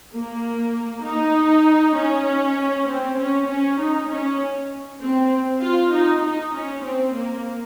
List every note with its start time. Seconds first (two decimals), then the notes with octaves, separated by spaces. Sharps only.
0.13 A#3
1.05 D#4
1.96 C#4
2.88 C4
3.18 C#4
3.48 C#4
3.79 D#4
4.09 C#4
5.01 C4
5.62 F4
5.93 D#4
6.23 D#4
6.53 C#4
6.84 C4
7.15 A#3